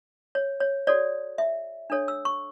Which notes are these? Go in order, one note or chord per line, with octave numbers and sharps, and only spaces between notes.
C#5
C#5
F#4 A4 C#5 D5
E5
D4 A4 C#5
E6
C#6